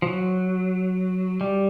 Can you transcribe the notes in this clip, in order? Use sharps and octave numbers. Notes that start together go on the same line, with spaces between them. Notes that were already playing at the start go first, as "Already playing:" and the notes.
F3
F#3
G3